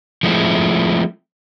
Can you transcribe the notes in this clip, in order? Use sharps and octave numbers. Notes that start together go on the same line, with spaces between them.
F3 G#3 A3 C4 D4 E4